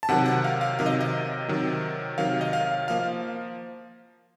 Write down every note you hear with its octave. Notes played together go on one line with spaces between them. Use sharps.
A5
C3 D#3 F#3 F#5
F#5
F5
F5
C3 D#3 F#3 F5
D#5
D#5
C3 D#3 F#3
C3 D#3 F#3 F5
D#5
F5
F3 A#3 F5